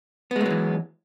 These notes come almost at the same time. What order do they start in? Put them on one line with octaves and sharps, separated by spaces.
B3 G#3 A3 F#3 E3